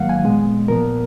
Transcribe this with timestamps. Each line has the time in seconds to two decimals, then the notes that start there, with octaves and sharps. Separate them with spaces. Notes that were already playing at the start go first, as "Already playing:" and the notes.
Already playing: G#2 D#3 F#3 A#3 F5 F#5
0.09 G#5
0.24 A#2 G#3 B3
0.68 A#2 F3 B3 A#4